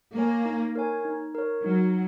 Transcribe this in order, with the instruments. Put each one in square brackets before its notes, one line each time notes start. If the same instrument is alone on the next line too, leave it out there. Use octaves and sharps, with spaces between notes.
[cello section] A#3 [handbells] A#4 C#5 G#5
[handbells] D#4
A#4 C#5 G#5
D#4
A#4 C#5
[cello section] F#3 [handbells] D#4